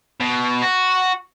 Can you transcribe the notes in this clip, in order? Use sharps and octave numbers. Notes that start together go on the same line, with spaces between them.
B2
F#4